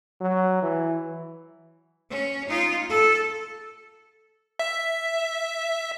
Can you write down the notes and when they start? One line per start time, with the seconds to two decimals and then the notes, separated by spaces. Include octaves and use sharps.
0.21 F#3
0.62 E3
2.10 C#4
2.49 D#4 F4
2.89 A4
4.59 E5